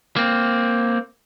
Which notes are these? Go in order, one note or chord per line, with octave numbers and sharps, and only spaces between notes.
A#3 C4